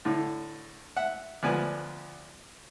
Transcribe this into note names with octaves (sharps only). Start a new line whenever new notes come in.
A2 D3
E5 F#5
D2 F3 B3 D5 G#5